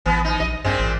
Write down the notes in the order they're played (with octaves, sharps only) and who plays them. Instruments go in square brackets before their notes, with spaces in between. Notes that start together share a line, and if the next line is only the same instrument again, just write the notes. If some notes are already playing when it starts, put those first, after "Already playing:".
[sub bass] A1 [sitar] E3 B3
[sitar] E3 D#4
[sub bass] A#1 [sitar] D#5
[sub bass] G2 [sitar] A#2 G#3 C4
[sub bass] A1